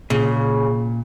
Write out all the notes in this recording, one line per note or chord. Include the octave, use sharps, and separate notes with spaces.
A#2 C#3